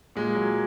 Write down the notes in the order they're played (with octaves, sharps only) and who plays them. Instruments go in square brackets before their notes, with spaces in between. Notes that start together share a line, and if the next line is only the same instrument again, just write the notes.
[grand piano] A#2 G#3
F#3